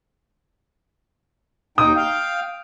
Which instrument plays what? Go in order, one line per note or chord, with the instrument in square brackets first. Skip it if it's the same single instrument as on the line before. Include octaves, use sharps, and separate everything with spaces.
[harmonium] D#2 D#4 G5 [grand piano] D#6
[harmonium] F5 G5